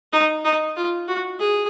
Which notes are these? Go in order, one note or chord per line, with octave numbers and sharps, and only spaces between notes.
D#4
D#4
F4
F#4
G#4